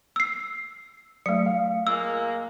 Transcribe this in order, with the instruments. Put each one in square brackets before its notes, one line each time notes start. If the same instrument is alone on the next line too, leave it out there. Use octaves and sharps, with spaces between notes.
[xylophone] E6 C7
[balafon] F#3 A3 [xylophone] C#7
[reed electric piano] F5
[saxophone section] A#2 G#3 A#3 [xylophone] E6